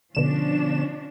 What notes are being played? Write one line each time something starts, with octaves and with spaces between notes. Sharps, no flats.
B2 D3 F3 C#4 D4 E7